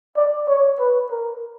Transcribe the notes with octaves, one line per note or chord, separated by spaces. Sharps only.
D5
C#5
B4
A#4